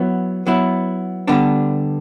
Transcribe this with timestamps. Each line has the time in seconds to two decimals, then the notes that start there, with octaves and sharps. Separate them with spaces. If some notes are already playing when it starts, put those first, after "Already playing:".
Already playing: F#3 B3 E4
0.47 F#3 B3 E4
1.27 D3 G3 B3 D4